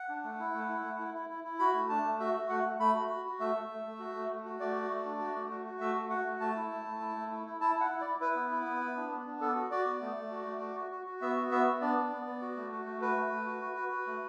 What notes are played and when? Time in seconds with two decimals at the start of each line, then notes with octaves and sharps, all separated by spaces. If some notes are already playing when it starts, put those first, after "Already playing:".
Already playing: F#5
0.09 D4
0.24 A3
0.39 E4
0.54 A3
0.69 E4
0.84 A3
0.99 E4
1.14 E4
1.30 E4
1.44 E4
1.59 F#4 B5
1.74 A3
1.89 D4 A5
2.04 A3
2.19 F#4 E5
2.34 F#4
2.50 A3 F#5
2.64 A3
2.79 A3 B5
2.94 F#4
3.09 F#4
3.25 F#4
3.40 A3 E5
3.55 A3
3.69 A3
3.85 A3
3.99 F#4
4.15 A3
4.30 A3
4.45 F#4
4.60 A3 D5
4.75 F#4
4.90 A3
5.05 D4
5.20 F#4
5.36 A3
5.50 F#4
5.65 F#4
5.80 A3 E5
5.95 F#4
6.10 F#4 F#5
6.26 A3
6.40 A3 A5
6.56 E4
6.71 A3
6.86 A3
7.00 E4
7.16 A3
7.31 E4
7.46 E4
7.61 E4 A5
7.76 E4 F#5
7.91 E4
8.01 E4 D5
8.20 E4 B4
8.36 B3
8.51 E4
8.66 B3
8.80 B3
8.96 D4
9.11 B3
9.27 D4
9.41 B3 A4
9.55 F#4
9.71 F#4 D5
9.86 B3
10.01 A3
10.16 A3
10.31 F#4
10.46 A3
10.61 F#4
10.76 F#4
10.92 F#4
11.06 F#4
11.21 B3 E5
11.37 F#4
11.51 B3 E5
11.67 B3
11.81 D4 D5
11.97 B3
12.12 B3
12.26 B3
12.42 F#4
12.57 A3
12.72 F#4
12.86 A3
13.01 F#4 B4
13.16 A3
13.31 A3
13.46 F#4
13.61 F#4
13.77 F#4
13.92 F#4
14.07 A3